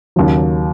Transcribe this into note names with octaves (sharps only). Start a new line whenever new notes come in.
D#2 C#3 F#3